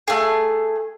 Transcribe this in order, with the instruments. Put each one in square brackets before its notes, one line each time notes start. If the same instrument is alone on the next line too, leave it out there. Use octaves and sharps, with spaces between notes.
[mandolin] A3 G#4